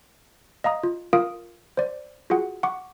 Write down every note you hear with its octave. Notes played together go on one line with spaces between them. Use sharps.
D#5 F5 A#5 D#6
F4
F4 A#4 F5 D#6 D7
C5 D5
F4 F#4 G#4 F#5
F#5 C#6 D6